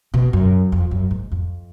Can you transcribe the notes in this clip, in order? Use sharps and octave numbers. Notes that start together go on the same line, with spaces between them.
B2
F#2
F2
F#2
G#2
F2